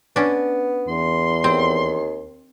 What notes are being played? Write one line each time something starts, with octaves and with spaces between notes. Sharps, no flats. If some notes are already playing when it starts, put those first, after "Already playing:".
B3 C#4 D4
E2 C6
D#2 C4